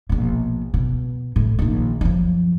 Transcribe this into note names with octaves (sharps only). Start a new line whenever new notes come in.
A#1 B2
B2
A2
A#1 D#3
F#2 F3